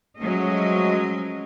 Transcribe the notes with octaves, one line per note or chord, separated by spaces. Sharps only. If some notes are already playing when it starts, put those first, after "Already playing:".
F3 F#3 G#3 A3 C#4 D#5